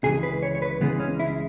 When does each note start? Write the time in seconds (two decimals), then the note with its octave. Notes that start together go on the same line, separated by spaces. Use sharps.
0.04 C#2 C#3 E3 G#3 G#4
0.23 B4
0.42 C#5
0.55 C#5
0.62 B4
0.81 C#2 C#3 E3 G#3 B3
1.00 C#4
1.20 E4